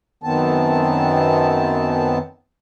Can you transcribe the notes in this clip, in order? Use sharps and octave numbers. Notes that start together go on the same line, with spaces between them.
F#2 D#3 B3 C4 A5